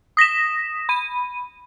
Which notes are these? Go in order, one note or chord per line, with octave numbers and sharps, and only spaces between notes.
D#6 A#6 B6 E7
B5 D#7